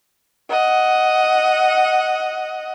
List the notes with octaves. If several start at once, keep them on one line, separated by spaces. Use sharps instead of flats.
D#5 F#5